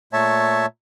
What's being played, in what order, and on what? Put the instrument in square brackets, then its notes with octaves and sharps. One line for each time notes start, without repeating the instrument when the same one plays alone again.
[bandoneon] A#2 A3 C#5 E5 A5